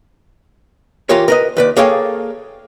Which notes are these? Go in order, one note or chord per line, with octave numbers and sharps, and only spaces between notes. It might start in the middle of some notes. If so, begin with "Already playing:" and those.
E3 F4 G4 A#4 C#5
A#4 B4 D#5
D#2 B4 D5
A#3 G#4 A4 C#5 F5 G5